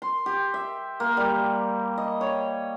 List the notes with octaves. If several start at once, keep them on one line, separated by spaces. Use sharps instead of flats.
C6
G4
E5
A#3
G3
D#5
C#5